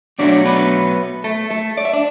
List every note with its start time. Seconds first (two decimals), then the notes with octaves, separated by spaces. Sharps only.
0.19 B2 F#3 A3 D4 D5
0.45 B3 B4
1.24 A3 A4
1.50 A3 A4
1.77 D5
1.85 E5
1.93 D4 D5